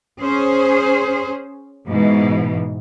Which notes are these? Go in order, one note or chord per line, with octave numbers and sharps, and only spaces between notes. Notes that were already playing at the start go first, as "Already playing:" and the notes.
C#4 G#4 C5
G#2 B2 E3